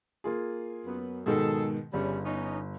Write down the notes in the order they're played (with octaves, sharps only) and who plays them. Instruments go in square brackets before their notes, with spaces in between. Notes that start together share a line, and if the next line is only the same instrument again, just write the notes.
[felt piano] A#3 F4 G#4
[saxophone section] F#2 B3
[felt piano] G#2 B2 D#3 [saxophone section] F#3 G#4 A4
[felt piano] G1 [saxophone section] C#3 G3 C#4
[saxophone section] B3 C#4 D#4